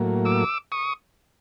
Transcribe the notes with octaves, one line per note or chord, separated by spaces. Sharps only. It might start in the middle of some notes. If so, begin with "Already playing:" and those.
Already playing: A2 F#3 A#3
D6 E6
C#6 D#6